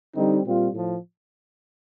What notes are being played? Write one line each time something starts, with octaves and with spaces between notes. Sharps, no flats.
D3 G3 C4 D#4
A#2 G3 C4 F4
A2 F3